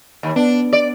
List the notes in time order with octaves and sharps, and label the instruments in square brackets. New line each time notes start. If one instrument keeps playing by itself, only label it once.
[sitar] D#2
[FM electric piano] B3 [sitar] D4
[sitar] D5